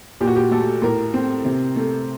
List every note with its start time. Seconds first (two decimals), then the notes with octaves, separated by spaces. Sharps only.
0.20 A#2 G4
0.27 F#4
0.36 G4
0.51 A3 A4
0.82 A2 A#4
1.14 C4
1.45 C3
1.76 A3